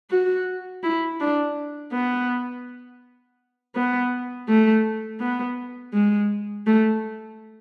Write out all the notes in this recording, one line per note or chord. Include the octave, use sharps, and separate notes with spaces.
F#4
E4
D4
B3
B3
A3
B3
G#3
A3